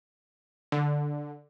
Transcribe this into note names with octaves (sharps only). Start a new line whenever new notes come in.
D3